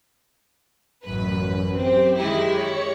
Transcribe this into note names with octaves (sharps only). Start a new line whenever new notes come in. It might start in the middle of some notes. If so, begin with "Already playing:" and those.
A1 F#2 B4
C4 G4
D#3 G#3 E4
C#5 C#7